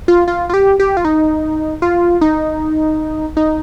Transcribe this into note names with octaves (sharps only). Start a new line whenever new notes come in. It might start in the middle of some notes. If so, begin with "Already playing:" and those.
F4
F4
F4
G4
G4
F4
D#4
F4
D#4
D#4